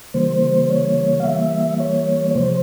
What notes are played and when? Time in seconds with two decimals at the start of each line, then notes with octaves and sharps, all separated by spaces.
0.14 C#3 E3 G3 A#3 C5
0.70 C#5
1.20 F5
1.24 E3 G3 A#3 E5
1.80 C#5
2.31 C#5
2.35 C3 F3 G#3 C5